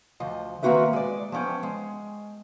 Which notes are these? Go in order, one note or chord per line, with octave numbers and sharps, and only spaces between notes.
D2 F3 D#5
D#3 A#3 C4 F#4 B4 E5
G#3 D5
F3 B3 C#4 G5
G#3